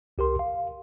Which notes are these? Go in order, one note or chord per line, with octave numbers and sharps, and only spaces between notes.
C2 G4 A#4 C6
F5